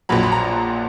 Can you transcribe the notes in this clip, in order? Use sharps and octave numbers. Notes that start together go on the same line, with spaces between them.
A#1 A#2 F#3 B5
B5
A#5